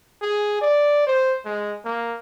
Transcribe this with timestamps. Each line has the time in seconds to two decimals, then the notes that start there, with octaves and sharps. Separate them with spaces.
0.22 G#4
0.61 D5
1.06 C5
1.45 G#3
1.85 A#3